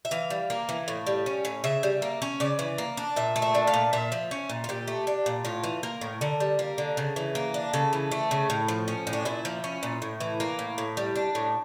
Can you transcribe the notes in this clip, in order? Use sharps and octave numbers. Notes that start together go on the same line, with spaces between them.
E5
E3 F5
G3
A#3
E3
A2
G3
C#4
A2
C#3 E5
G3
A#3
C#4
C#3 D5
E3
A#3
D4
A#2 E5
A3
E5
D4
F5
A#2
A#2 E5
F3
C#4
A#2
F4
A#2 G4
A3
D4
A#2
A2 F4
E3
A#3 A#4
A2
D3 A#4
G3
A#3
D3
C#3
E3
A#3
D4
C#3 A4
E3
A3
C#3
A2
F3
C#4
A2
D4
A#2 E4
F3
C#4
A#2
A2
E3
A#3
A2
A2
G3
D4
A2